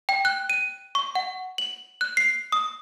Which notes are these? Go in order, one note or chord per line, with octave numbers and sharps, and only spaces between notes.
G5
F#6
D#7
C#6
F#5
F#7
F#6
C7
D#6